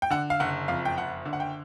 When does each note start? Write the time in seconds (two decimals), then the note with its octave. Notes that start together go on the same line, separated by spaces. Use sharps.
0.02 G5
0.10 D3 F#5
0.30 F5
0.40 F#1 F#5
0.68 F2 F5
0.85 G5
0.97 F#1 F#5
1.25 D3
1.33 F#5
1.40 G5